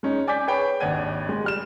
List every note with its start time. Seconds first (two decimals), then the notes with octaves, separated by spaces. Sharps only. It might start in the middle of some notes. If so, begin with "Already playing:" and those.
0.03 G#3 C#4 D#4
0.27 D5 G#5 D6 G6 B6
0.47 G#4 B4 C#5 G5 B5
0.80 G#1 D#2 D4 F#5 G#6 D#7
1.29 G#3
1.44 G3 F6 E7